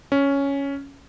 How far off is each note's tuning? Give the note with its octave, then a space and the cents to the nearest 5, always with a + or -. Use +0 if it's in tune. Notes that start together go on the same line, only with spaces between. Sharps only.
C#4 +5